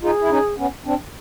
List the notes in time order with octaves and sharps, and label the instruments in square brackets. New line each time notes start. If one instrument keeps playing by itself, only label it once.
[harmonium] D#4 F4 [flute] G#4
[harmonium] E4
C#4 D#4
B3 C#4
C4 D4